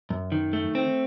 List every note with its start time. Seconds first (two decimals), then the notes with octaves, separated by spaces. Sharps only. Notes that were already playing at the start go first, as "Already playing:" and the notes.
0.10 F#2
0.32 D#3
0.53 A3
0.75 C4